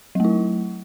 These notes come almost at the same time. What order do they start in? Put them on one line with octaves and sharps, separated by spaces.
F#3 A3 E4